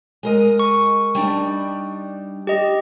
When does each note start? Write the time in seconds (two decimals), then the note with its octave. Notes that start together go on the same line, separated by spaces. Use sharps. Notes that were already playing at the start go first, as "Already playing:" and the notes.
0.23 G#3 A#4 D#5
0.59 C#6
1.15 G3 D4 D#4
2.47 G4 D#5